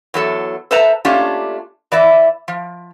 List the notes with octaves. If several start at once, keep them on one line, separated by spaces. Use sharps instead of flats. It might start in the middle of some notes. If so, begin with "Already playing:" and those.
E2 F#3 A4
A4 B4 C5 E5 A5 A#5
A3 A#3 C#4 D4 F4 G4
E3 D5 E5
F3